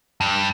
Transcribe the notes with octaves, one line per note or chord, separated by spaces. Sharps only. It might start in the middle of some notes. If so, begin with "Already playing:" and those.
G2